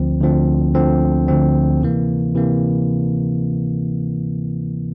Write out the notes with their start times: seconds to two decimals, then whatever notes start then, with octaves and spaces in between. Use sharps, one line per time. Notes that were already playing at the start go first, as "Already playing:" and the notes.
Already playing: D2 D3 F3 C4
0.21 D2 D3 F3 C4
0.74 D2 D3 F3 C4
1.28 D2 D3 F3 C4
1.81 C3 E3 A#3
2.35 C3 E3 A#3